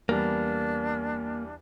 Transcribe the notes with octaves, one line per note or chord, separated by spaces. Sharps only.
E2 G3 A#3 D4